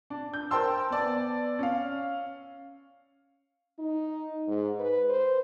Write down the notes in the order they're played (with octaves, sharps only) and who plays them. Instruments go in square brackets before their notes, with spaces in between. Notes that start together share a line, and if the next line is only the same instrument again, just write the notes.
[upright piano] D4
G6
A#4 C5 G5 A5 C6 E6
B3 D5 A5
C#4 F5
[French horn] D#4
G#2
B4
C5